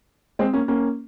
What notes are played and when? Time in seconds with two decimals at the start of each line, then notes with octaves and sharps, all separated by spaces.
0.39 G#3 C4
0.53 A#3 C#4
0.68 A#3 C#4